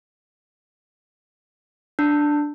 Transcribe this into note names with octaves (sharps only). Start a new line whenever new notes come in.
D4